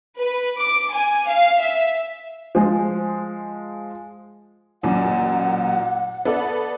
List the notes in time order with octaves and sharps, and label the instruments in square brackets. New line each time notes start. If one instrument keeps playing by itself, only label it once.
[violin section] B4
D6
G#5
F5
E5
[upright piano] F3 G#3
[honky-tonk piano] A1 F#2 A#2 [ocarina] F#5
[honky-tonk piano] B3 A4 D5